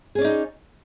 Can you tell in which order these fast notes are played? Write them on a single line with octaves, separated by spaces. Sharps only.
G#4 C#4 D5 D#4